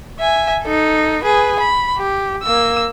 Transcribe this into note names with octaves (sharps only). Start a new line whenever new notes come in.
E5 G#5
D#4 A4
G#4 B4
B5
G4
A#3 E6